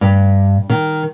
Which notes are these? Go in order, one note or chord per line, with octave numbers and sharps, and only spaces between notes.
G2
D#3